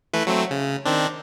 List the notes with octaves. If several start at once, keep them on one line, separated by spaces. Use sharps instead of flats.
E3 A3 B4
F#3 A3 C4
C#3
D#3 C4 D4